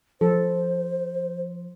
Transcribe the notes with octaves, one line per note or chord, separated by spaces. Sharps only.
F3 A4 C5